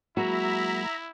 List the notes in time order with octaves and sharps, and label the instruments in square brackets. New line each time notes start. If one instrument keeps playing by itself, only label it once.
[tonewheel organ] F#3 G#3 A#3 [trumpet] E4 [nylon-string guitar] F#4 [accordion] E5 A#5 B5